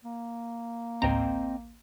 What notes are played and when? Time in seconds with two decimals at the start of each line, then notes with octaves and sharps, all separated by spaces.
0.05 A#3
1.02 A1 D2 C4 D#5 G5 A#5